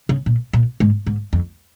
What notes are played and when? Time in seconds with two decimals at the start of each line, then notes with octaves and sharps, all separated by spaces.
0.09 C#3
0.26 A#2
0.53 A#2
0.80 G#2
1.07 G#2
1.33 F2